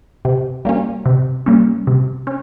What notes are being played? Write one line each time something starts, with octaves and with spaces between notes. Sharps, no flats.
C3
G3 A#3 C#4
C3
G3 A#3 C#4
C3
C#4